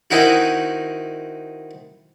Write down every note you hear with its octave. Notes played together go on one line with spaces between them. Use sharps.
D#3 C4 D#4 E4 F#4